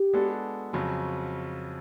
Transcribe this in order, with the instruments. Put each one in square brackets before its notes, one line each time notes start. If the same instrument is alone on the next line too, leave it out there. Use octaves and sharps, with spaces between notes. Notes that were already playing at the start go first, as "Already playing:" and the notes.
Already playing: [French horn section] G4
[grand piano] G#3 B3 D4 F#4 A4
F2 C#3 F#3